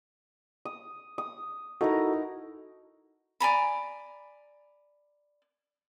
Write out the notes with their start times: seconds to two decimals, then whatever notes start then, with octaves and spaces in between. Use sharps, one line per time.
0.65 D#6
1.18 D#6
1.81 D#4 E4 F#4 A4 A#4
3.40 D5 G#5 A#5 B5